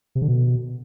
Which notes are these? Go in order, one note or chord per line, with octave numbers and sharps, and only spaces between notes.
C3
D3
B2